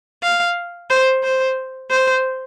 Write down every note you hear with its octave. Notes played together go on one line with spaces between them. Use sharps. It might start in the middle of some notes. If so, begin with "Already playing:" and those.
F5
C5
C5
C5